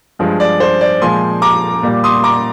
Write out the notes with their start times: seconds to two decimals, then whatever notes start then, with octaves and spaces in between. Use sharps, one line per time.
0.19 G2 F3 G#3
0.40 D5
0.60 C5
0.81 D5
1.01 A#2 F3 G#3 G#5 C6
1.42 A#5 D6
1.83 A#2 G3
2.04 C6 D#6
2.24 A#5 D6